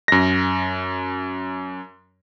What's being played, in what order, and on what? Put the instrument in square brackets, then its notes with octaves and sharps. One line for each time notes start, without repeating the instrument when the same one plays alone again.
[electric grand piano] F#2 A#6